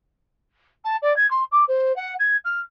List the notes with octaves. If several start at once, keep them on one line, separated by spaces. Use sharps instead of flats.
A5
D5
G#6
C6
D6
C5
F#5
G#6
F6